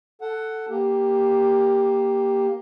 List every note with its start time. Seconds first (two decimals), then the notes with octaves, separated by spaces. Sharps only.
0.21 A4 F#5
0.69 A#3 G4